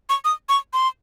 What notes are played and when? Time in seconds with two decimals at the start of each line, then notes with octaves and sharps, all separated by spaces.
0.09 C#6
0.25 D#6
0.49 C#6
0.73 C6